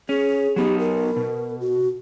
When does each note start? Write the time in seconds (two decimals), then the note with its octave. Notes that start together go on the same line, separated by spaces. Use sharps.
0.09 C#4 G#4
0.56 F#3 B3 D#4 G4
0.79 A#4
1.17 B2
1.61 F#4